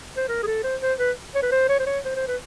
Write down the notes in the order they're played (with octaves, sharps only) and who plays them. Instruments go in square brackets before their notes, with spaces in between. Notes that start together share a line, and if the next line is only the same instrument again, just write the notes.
[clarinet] C5
A#4
G#4
A4
C5
C5
B4
C#5
B4
C5
C#5
C5
C#5
C5
C5
B4